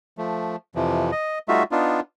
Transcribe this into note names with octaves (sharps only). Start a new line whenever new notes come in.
F3 A3
F2 C3 E3 F3
D#5
G3 A3 D#4 F4 F#4 E5
B3 D4 D#4 F4